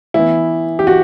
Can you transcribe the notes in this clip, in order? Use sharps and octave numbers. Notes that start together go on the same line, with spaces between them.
E3 B3 E4
G4
F#4